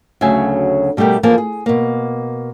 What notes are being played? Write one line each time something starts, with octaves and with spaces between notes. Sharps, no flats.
D2 C#3 F#3 E5 G#5
B2 G3 A3 G4 A#4
E3 F3 A#3 G#4 A5
G#4
B2 A#3